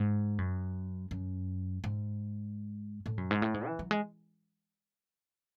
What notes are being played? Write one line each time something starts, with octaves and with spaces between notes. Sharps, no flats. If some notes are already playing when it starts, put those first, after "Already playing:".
Already playing: G#2
F#2
F#2
G#2
A2
F#2
G#2
A2
G#2
E3
F#3
G#3